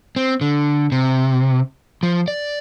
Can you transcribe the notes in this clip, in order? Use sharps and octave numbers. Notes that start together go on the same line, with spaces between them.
C4
D3
C3
F3
D5